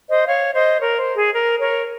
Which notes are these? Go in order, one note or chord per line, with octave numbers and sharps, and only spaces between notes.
C5 D#5
C#5 F5
C5 D#5
A#4 C#5
C5
G#4
A#4
A#4 C#5